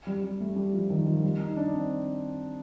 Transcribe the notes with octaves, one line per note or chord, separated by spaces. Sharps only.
G3
G3
A3
G3
F3
D#3
F3
G3
D#4
D4
C4